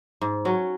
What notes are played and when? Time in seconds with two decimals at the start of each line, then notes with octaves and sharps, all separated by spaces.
0.21 G#2
0.45 F#3 C#4